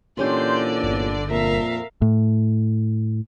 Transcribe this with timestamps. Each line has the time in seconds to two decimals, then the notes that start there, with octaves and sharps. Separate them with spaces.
0.17 A#2 D3 E3 C#4 G4 D5 C6 G6
0.83 G1
1.30 F2 A#2 A#4 E5 F5
2.02 A2